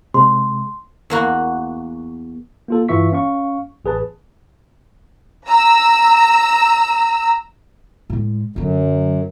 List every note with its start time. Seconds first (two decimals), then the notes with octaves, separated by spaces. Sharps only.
0.14 C3 G#3 C6
1.10 E2 A#3 F#4
2.68 A#3 F4 A4
2.89 G2 E3 F4 E5 C#6 B6
3.12 C#4 F5 C#6
3.85 A1 G#4 B4 A5
5.47 A#5 E6
8.10 A2 G#3
8.56 F#2 D3 F#3